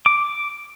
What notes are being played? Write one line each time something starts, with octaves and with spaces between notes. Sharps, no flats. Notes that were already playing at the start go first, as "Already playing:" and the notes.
D6